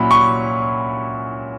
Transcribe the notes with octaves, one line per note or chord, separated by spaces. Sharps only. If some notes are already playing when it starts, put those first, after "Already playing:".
Already playing: A#2 F#3 C#4 E4 B5
C#6